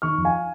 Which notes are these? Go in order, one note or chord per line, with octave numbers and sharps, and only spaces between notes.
D#3 C#6 F6
F2
F5 G#5